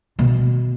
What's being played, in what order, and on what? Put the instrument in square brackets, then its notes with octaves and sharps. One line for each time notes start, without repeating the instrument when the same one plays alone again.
[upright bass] B2